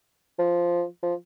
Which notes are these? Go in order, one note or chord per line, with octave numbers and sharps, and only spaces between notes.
F3
F3